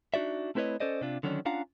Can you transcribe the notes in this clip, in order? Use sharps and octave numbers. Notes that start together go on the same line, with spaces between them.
D4 D#4 F#4 D5 E5
A3 C4 E4 B4 C#5 D#5
C#4 A4 C5 D5 D#5
C3 D4 F4
D3 D#3 F#3 C#4 D4
C#4 D4 F4 F5 F#5 A#5